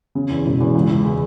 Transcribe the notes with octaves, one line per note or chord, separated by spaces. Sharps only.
C#3
E2
E1
E2
C#2
C#2
G#3